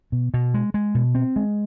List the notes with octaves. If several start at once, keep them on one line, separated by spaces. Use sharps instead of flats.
B2
B2
G#3
G#3
B2
C4
G#3